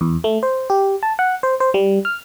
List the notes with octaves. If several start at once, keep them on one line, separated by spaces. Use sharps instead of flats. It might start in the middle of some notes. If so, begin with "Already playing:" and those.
E2
A3
C5
G4
A5
F#5
C5
C5
G3
F6